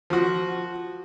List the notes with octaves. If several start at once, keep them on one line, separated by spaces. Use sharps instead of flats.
F3 F#4